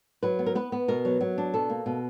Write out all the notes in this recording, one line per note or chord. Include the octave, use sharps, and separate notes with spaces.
F#3 B4
B3
A#4
B3 B4
B3
B2 A#4
F#3
F#3
D4
B2 A4
A#3
B2